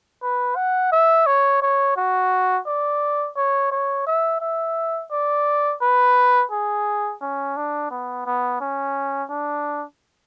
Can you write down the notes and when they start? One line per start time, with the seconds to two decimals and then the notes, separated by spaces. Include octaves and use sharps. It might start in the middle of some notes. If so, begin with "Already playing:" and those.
0.22 B4
0.56 F#5
0.92 E5
1.27 C#5
1.62 C#5
1.97 F#4
2.67 D5
3.37 C#5
3.71 C#5
4.07 E5
4.41 E5
5.11 D5
5.81 B4
6.51 G#4
7.21 C#4
7.56 D4
7.91 B3
8.26 B3
8.60 C#4
9.30 D4